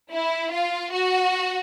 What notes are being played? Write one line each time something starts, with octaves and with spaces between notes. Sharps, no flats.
E4
F4
F#4